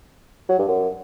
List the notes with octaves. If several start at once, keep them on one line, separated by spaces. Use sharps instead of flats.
F#3
G2
F#2